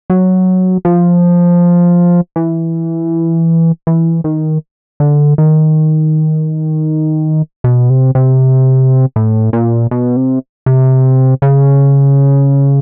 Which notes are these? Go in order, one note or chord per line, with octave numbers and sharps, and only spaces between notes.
F#3
F3
E3
E3
D#3
D3
D#3
B2
C3
C3
A2
A#2
B2
C3
C3
C#3